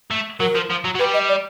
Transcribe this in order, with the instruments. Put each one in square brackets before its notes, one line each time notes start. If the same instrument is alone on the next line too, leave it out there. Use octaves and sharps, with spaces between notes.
[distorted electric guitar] A3
[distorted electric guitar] F#3 [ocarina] A#4
[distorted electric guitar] F3
F3
F#3
F#3
[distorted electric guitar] G3 [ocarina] B4
[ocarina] D#5
D5